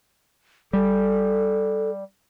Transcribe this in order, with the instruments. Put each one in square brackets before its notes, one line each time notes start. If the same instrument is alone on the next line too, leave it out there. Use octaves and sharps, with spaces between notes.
[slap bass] G3 [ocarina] A4